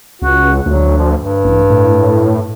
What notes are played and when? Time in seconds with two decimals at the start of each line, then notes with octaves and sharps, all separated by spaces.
0.22 C#2 F#4
0.66 D2 F#3
0.98 F3
1.15 G2
1.44 A1
1.70 A2